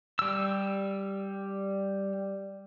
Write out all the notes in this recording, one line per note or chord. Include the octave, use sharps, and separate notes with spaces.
G3 E6